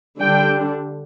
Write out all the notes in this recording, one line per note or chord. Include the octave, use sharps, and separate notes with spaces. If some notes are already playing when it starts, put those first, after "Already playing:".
D3 G3 D4 G5